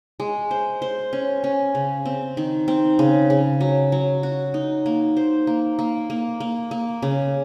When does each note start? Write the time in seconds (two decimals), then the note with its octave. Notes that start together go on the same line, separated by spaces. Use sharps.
0.20 G#3
0.51 C5
0.82 C5
1.13 C#4
1.44 C#4
1.75 C#3
2.05 C4
2.37 D#3
2.68 C4
2.99 C#3
3.30 C#3
3.61 F#3
3.92 F#3
4.23 F#4
4.54 D#4
4.86 A#3
5.17 C5
5.47 A#3
5.79 A#3
6.10 A#3
6.40 A#3
6.71 A#3
7.02 C#3